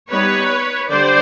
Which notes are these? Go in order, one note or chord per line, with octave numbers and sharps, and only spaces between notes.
G3 B3 D#4 B4 C#5
D3 G3 C5 D5